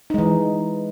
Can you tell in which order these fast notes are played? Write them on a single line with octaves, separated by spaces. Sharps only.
D#4 G#3 E3